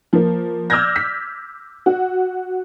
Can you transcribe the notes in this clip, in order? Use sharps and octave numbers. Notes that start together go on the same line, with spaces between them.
F3 A#3
D6 E6 F6 G6 G#6 A#6
B6
F#4